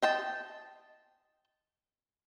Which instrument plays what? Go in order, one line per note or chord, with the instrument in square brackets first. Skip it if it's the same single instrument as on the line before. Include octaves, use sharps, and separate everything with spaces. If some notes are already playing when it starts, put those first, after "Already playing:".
[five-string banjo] D#5 G5 A5